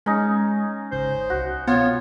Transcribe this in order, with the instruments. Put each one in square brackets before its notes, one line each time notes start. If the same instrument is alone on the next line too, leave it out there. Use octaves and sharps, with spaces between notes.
[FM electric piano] G#3 [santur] C#4 D#4
[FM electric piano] G#1 C#3 G6 [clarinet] C5
[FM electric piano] C2 [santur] F#4
[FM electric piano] B2 [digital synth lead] B3 [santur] F4 [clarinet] C#5